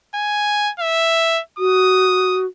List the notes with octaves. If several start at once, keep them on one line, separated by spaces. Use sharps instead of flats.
G#5
E5
F#4 D#6